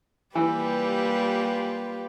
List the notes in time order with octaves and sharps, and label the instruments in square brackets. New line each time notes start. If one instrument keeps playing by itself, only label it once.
[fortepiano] E3 [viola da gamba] G3 A#3 G4 [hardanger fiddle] F4 B4